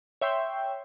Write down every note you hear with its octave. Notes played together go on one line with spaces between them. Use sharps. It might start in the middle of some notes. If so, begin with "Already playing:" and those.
C#5 E5 G5 C6